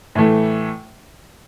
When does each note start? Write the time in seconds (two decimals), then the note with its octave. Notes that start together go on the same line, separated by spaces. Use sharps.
0.15 A2 E3 A3